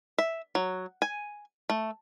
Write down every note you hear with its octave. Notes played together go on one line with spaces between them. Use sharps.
E5
F#3
G#5
A3